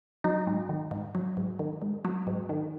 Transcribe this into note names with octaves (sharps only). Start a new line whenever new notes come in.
F#3 D#4
G#2
D#3
G#2
F#3
G#2
D#3
G#2
F#3
G#2
D#3